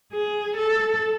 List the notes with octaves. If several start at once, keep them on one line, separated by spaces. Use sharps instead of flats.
G#4
A4